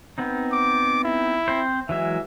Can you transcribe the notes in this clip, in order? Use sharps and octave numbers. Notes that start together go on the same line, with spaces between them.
B3 C4 D#4
D6
E4
C4 C5
E3 F#3 G#3 E5